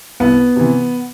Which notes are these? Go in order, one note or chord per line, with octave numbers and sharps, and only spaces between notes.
C2 B3
C3 E3